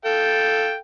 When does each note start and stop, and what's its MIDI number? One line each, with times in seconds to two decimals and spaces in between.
0.05 0.76 69
0.05 0.76 77
0.05 0.76 79